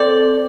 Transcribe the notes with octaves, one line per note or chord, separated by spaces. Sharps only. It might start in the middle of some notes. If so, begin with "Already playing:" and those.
Already playing: C4 A4 D5